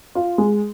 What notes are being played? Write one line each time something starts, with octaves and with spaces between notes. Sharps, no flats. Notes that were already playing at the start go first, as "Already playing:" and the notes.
F4
G#3